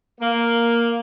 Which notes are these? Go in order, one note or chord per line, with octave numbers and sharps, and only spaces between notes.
A#3